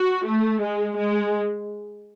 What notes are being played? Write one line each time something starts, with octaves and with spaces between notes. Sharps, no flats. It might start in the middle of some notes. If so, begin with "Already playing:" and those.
Already playing: F#4
A3
G#3
G#3